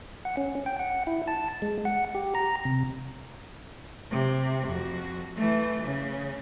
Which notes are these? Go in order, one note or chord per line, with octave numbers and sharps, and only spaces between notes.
F#5
C#4
G5
F#5
E4
A5
G#3
F#5
G4
A#5
C3
C3
F2 F#4
E3 A3
C#3